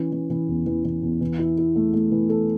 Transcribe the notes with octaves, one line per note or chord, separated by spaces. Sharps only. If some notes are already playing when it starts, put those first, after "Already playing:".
Already playing: E3 C#4
E3
E3
E2
E3
E3
E2
E3
E4
E4
A3
A3
E3
A4